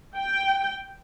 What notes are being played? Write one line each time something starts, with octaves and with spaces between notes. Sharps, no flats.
G5